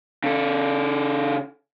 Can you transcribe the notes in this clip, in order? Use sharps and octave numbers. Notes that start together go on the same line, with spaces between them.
C#3 A4